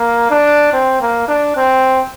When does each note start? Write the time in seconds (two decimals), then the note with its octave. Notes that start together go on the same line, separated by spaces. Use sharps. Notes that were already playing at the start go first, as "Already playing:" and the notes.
Already playing: A#3
0.30 D4
0.73 C4
1.01 A#3
1.28 D4
1.57 C4